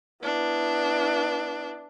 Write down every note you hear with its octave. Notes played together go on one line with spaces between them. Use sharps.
B3 D4 E4